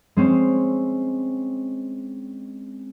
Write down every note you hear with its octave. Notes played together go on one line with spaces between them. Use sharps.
G#3 C4 C#4